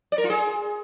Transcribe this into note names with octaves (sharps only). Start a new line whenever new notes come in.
D5
A#4
F4
G#4